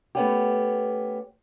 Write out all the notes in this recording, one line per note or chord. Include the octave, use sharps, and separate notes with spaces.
A3 B3 C#4 G4